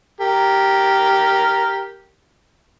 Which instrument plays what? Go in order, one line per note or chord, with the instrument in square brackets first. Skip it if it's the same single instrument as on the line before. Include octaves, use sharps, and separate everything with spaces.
[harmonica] G4 A#4